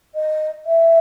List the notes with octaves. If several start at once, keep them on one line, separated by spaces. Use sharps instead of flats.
D#5
E5